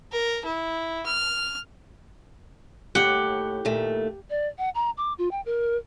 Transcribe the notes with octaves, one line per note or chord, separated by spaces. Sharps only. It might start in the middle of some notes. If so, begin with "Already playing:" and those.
A#4
E4
F6
D#2 A2 G4 F#5
D#2 A#2 A3
D5
F#5
A#5
D6
F4
G5
A#4